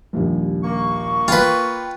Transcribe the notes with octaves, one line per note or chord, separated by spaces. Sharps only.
A#1 D#2 G3
A#3 C#6
F4 B4 G5 B5